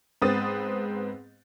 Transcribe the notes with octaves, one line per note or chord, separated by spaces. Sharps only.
G#2 B3 C4 B4 D#6 A6